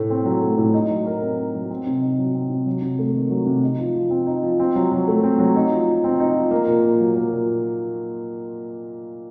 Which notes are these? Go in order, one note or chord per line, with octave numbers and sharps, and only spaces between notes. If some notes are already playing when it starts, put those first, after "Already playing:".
Already playing: A2 A3
C4
F#3
A3
A2
D#4
F#3
A#4
C4
D#4
F#3
C4
C3
D#4
F#3
C4
C3
F#3
C3
A3
D#3
F#3
C3
D#4
F3
F3
C4
D#4
F3
C4
F#3
F#3
A3
C4
F#3
D#4
F3
F3
C4
D#4
F3
A#3
A#2
A#2
F#3
A#3
A#2